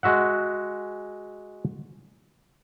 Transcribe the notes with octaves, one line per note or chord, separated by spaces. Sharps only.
G#3 F#4 E5 F#5